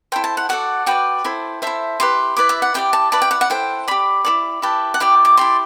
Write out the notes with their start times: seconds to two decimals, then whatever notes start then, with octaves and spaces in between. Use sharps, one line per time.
0.12 E4 A4 C5 G5
0.24 A5
0.37 F#5
0.49 F#4 A4 D5 F#5
0.86 F#4 B4 D5 G5
1.24 E4 A4 C5
1.62 E4 A4 C5 E5
2.00 E4 G4 B4 C6
2.37 E4 B4 D5 D6
2.49 E5
2.62 F#5
2.74 E4 G4 B4 D5 G5
2.93 A5
3.12 E4 B4 D5 A5
3.22 G5
3.31 F#5
3.41 F#5
3.50 E4 A4 C5 G5
3.88 G4 D5 B5
4.25 E4 A4 D5
4.62 E4 G4 B4 A5
4.94 F#5
5.00 E4 G4 D5 G5
5.25 D6
5.37 E4 G4 D5 C6